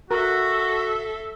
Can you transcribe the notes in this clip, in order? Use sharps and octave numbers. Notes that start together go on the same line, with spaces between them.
F#4 A4 A#4 E5